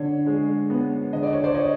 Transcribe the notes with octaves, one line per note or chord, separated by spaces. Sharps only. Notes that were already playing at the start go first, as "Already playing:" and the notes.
Already playing: D3 C#5
G#3
B3
D3 D#5
D5
C#5
C5 D5
C#5 D#5